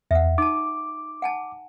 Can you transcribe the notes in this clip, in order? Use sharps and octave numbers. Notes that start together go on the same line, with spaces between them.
E2 E5 F#5
D#4 A5 D6
F#5 G#5 A5